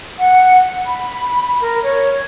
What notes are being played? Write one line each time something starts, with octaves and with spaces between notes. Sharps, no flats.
F#5
B5
A#4
C#5